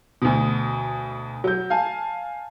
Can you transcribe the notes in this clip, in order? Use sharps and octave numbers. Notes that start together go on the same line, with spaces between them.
D2 B2
F#3 G6
F5 G#5 A5